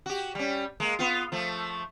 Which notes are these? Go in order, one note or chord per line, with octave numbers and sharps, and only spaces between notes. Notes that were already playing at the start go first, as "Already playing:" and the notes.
F#4 G4
G3 C#4
G#3 A#3
B3 F4
F3 A3